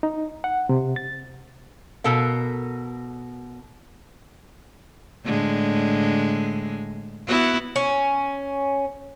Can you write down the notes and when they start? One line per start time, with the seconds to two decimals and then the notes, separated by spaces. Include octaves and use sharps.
0.03 D#4
0.44 F#5
0.69 C3
0.96 A6
2.04 B2 A4 A#4 F5
5.25 A2 D3 G#3
7.28 B3 E4 F#4
7.76 C#4